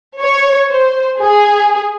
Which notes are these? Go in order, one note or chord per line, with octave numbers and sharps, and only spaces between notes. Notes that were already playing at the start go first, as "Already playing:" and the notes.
C#5
C5
G#4